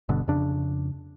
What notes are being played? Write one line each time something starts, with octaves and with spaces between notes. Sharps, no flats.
G1 G2 B2 D3
F2 C#3 D4